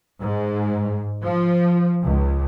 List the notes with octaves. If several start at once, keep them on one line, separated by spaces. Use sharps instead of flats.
G#2
F3
C#2